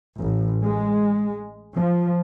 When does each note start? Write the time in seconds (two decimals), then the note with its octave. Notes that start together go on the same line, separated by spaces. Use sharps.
0.15 A1
0.64 G#3
1.74 F3